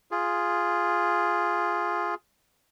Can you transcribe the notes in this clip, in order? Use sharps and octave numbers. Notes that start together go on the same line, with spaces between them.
F4 G#4